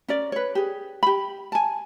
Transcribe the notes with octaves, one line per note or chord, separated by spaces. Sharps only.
C#4 A#4 D5
B4 C#5
G4 G#4
G4 B5
G#5 A5